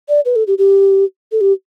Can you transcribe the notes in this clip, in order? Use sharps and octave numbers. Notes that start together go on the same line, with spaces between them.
D5
B4
A4
G4
G4
A4
G4